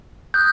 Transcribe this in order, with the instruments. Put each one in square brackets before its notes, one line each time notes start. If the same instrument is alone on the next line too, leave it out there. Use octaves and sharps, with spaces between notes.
[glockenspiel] D#6 F#6 G6